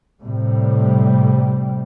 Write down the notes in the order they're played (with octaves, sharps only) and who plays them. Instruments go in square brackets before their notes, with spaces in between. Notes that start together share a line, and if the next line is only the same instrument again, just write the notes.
[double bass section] A2 C3 G3